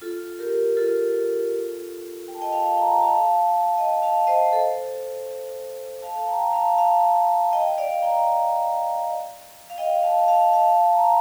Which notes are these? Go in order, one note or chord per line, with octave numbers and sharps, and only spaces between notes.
F4 A4
G4 A#4
F4 A4
G5
A5
D#5 G5
F5 A5
G5 A#5
G5
F5 A5
D#5 G5
F5 A5
C5 D#5
A4 C5
F5 A5
G5 A#5
F5 A5
F5 A5
D#5 G5
D5 F5
G5 A#5
F5
D#5 G5
F5 A5
F5 A5
F5 A5
A#5
F5 A5